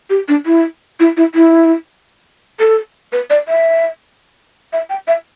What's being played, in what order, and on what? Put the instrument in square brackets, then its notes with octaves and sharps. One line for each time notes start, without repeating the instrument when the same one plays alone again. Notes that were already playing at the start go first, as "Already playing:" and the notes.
[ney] G4
D4
E4
E4
E4
E4
A4
B4
D5
E5
E5
G5
E5